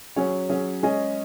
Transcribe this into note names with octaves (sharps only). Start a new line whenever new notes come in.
F#3 C#4 G#4 C#5
F#3 C#4 G#4 C#5
G#3 C#4 G#4 D#5